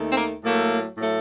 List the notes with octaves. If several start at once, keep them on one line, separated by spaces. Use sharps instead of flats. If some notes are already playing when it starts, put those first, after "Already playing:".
Already playing: D#2 D#3 A3
C4
A#3
A2 F#3 A3 A#3
A2 F#3 A3